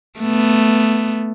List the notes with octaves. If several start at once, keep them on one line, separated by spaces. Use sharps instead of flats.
A3 B3